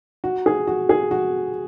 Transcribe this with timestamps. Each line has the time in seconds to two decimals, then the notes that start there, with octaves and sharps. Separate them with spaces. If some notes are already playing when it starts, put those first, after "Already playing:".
0.24 F#4
0.46 G#4
0.67 F#4
0.89 G#4
1.11 F#4